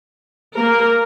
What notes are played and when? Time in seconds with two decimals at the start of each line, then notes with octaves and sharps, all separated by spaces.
0.56 A#3 A#4